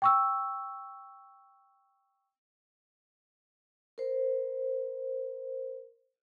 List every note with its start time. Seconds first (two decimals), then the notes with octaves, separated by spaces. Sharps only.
0.02 G5 C#6 E6
3.98 A#4 C5